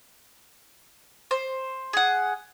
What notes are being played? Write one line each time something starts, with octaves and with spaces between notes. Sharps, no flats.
C5
G#4 F#5